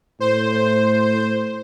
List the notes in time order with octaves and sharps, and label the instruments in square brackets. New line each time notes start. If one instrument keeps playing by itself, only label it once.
[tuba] A2 [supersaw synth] C5